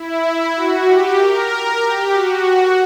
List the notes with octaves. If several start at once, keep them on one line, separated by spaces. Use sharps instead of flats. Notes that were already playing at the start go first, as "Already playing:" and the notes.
Already playing: E4
F#4
G4
A#4
G4
F#4